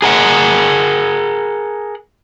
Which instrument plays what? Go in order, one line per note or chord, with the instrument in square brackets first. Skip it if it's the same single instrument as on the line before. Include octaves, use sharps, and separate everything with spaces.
[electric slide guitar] G#4 A#4 F#5